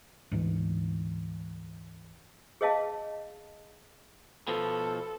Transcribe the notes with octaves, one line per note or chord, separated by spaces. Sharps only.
D2 G#2 E3
G#4 C#5 D#5 F5 A5
B2 F3 A4